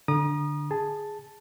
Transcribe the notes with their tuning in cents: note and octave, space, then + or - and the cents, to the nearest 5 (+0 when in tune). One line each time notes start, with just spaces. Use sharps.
D3 +5 A#5 +35 D#6 -25
G#4 +0 A5 +0